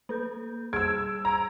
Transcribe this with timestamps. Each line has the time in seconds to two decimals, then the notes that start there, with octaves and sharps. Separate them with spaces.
0.09 A#3 A4 G6
0.73 G3 G#4 E6 G#6 D7
1.25 A#5 E6 G#6 D7